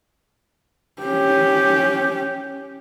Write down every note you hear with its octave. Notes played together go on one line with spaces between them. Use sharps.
C#4 G4